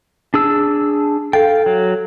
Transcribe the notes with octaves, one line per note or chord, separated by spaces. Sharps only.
D4 G#4 E6
A4 F5 G5
F#3